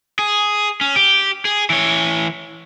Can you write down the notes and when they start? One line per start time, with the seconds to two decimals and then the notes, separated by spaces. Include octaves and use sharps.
0.19 G#4
0.81 C#4
0.96 G4
1.45 G#4
1.70 E3 C#5